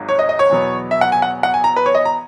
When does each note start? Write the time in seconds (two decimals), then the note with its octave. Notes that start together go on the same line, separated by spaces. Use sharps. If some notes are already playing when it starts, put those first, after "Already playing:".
Already playing: G#1 G#2 F#3
0.09 C#5
0.19 D#5
0.29 D#5
0.39 C#5
0.49 E2 B2 F#3 B3
0.91 E5
1.01 F#5
1.12 G#5
1.22 F#5
1.43 F#5
1.54 G#5
1.64 A#5
1.76 B4
1.86 C#5
1.95 D#5
2.05 A#5